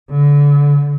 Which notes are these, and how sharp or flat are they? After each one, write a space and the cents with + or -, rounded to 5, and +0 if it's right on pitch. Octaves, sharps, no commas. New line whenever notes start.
D3 -30